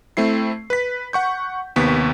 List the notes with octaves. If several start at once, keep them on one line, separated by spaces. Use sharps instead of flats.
A3 C4 E4 C7
B4 B6
F#5 C#6 G6
D#2 C3 B3 C#6 B6